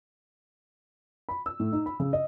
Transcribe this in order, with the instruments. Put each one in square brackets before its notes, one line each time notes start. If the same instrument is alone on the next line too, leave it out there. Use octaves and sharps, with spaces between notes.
[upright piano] B5
E6
A2
D#4
B5
C#3
D#5